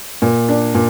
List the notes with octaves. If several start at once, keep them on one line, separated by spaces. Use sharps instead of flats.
A#2
D4
A#2